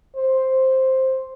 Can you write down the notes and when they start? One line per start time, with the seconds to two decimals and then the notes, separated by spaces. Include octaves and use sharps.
0.16 C5